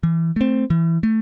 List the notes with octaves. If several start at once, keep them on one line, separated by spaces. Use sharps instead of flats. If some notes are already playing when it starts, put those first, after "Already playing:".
E3
A3 C4
E3
A3